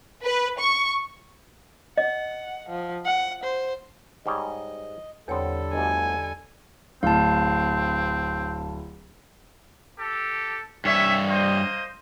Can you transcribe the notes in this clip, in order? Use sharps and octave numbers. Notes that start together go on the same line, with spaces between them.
B4
C#6
D#5 F#5
F3
F#5
C5
G#2 G3 C#5 D#5
E2 D3 G3 B3 C4 A4 C#5
G1 D2 D#5 G#5
D1 C4 F5 A5
G4 A4
G2 C#4 C#5 E5
A#3 C5 D#5